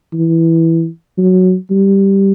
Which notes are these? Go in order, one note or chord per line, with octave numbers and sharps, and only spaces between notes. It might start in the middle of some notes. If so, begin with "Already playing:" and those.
E3
F#3
G3